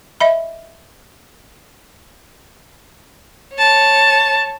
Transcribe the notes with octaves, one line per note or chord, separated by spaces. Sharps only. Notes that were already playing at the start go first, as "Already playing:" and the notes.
D#5 E5 B5
C#5 A5